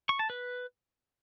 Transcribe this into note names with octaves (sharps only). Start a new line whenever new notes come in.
C#6
A5
B4